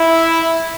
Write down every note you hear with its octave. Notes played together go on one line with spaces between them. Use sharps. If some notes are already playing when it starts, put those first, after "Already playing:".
Already playing: E4